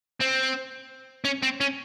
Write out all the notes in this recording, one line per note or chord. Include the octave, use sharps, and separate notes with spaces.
C4
C#4
C4
C#4